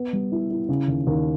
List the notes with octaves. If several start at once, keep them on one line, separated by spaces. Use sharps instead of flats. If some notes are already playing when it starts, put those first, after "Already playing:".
Already playing: B3
G3
E4
E4
C#3
D#2
D#2